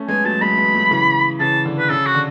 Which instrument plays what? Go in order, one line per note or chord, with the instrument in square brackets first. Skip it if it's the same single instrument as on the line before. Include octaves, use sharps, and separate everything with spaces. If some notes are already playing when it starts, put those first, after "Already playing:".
Already playing: [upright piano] A3 C#4
[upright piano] G#3 B3 [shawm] G#5
[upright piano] F#3 A3 [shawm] A5
[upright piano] G#3 B3 [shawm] B5
[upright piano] G#3 B3
F#3 A3
C#3 E3
[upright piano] C#3 E3 [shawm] A5
[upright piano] D3
[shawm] B4
[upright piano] C#3 [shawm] A4
[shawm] F#4
[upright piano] D3